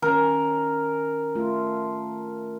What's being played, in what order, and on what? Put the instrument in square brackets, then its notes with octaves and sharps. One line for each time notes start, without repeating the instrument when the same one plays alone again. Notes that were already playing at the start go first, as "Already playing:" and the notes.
[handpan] D#3 C#4 [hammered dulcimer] A#4
[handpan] A3 F4